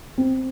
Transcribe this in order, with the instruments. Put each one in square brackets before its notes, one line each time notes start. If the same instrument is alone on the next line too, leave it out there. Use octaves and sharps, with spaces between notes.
[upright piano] C4